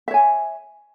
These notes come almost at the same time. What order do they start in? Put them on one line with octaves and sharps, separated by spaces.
E5 C#5 G#5